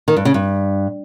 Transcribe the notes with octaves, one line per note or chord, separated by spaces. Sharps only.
D#3
G2
C#3
G2